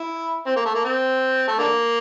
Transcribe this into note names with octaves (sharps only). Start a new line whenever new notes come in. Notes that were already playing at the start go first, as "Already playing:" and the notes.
Already playing: E4
C4
A#3
A3
A#3
C4
A3
D3 A#3